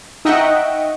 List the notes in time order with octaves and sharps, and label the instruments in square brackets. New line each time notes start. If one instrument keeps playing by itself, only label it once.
[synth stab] D#4 D#5 E5 F#5 G5 C#6